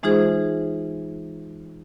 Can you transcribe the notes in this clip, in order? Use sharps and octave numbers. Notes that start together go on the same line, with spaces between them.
E3 G#3 D#4 F4 G#4 C5